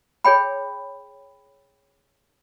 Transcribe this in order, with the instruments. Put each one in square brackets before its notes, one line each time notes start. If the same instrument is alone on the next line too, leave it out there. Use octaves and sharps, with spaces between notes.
[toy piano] G#4 C#5 G5 B5